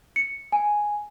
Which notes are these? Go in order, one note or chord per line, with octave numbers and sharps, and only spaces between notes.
C#7
G#5